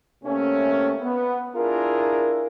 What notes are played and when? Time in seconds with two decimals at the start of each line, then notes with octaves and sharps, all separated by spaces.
0.24 C3 A3 A#3 C#4
1.02 B3
1.56 D4 E4 F4 G#4 A#4